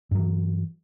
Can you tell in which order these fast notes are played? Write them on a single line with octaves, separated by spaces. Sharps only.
G2 F#3 E3